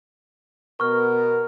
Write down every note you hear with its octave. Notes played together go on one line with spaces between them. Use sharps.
B2 B3 A#4 C#6 F6